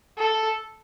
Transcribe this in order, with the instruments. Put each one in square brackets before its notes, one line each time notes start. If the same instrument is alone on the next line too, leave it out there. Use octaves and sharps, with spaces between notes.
[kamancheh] A4